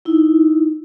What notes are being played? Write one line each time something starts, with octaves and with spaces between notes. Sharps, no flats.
D#4 E4